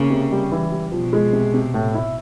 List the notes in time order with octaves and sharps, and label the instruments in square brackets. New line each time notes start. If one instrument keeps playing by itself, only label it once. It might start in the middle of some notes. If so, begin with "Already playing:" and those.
Already playing: [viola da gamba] C#3 [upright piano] A#3
[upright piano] C3
G3
E3
G3
[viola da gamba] B2 [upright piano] F3
[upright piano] G#3
C3
C3
A2
E4